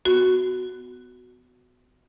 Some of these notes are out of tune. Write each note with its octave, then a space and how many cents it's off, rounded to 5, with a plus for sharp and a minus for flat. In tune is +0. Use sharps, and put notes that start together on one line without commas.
B3 +25 F#4 +0